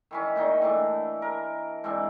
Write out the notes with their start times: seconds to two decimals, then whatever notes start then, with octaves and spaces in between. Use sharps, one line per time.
0.11 D#3 E3 C#4
0.36 A#2 D#3 D#4 G5
0.62 E3 A3 D4
1.22 A#4
1.84 G#2 E3 C4 D4